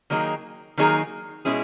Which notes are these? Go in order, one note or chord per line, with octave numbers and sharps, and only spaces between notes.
D#3 F#3 A#3 D#4 G#4
D#3 F#3 A#3 D#4 G#4
B2 G#3 C#4 E4 G#4